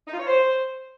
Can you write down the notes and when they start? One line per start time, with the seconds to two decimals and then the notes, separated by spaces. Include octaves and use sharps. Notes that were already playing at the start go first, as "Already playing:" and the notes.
0.06 D#4
0.13 F4
0.19 C#5
0.26 C5